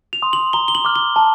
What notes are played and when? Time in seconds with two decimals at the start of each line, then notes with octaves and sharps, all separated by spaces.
0.13 F7
0.22 C6 D#6
0.33 F#7
0.53 A#5 G7
0.68 G7
0.75 F#7
0.85 D6 F6
0.96 G7
1.16 A5